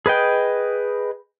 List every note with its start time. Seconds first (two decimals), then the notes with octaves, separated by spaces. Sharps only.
0.06 G#4 B4 D#5 G5